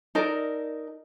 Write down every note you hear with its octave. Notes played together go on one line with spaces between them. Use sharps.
D#4 A4 A#4 D5